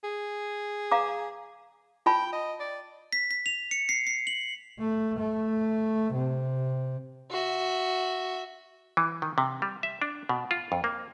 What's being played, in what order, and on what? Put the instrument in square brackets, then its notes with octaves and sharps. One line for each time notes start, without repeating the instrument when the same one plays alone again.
[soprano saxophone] G#4
[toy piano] F5 A#5 D6
[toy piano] F4 A5 B5 [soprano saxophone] G5
[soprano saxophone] D#5
D5
[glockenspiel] B6
B6
F7
C#7
C7
C7
F#7
[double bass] A3
A3
C3
[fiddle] F#4 E5
[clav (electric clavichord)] E3
D#3
C3
G3
E5
D4
B2
F4
F2
A#3